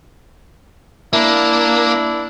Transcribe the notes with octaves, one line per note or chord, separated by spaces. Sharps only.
A#3 D4 E4